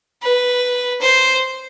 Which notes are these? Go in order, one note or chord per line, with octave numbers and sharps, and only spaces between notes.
B4
C5